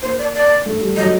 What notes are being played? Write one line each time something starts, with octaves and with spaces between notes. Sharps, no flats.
A#3 C5
D5
D5
A3
G3
F#3 D#5